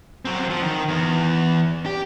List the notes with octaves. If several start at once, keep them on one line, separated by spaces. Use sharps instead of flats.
F#3 C4
F3
D#3
E2
G4